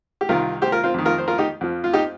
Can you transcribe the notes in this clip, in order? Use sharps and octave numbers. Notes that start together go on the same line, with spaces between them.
G4
C2 C3 D#3 F4 A#4
G4 C5
F4 A#4
C4 F4
F2 D#3
F4 A#4
C5
F4 A#4
D#4 G4
F2 F3
F4
D#4 G4